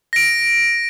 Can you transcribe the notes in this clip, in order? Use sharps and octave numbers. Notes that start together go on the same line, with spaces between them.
A#6 D7